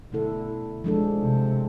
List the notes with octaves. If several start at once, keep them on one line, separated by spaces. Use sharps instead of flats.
B2 D3 A3 E4 A4
F3 G#3 D4 A4
C3